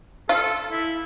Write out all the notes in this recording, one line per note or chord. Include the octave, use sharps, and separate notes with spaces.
F4 A4
E4